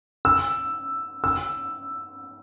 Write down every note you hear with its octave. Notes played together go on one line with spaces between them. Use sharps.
E6
E6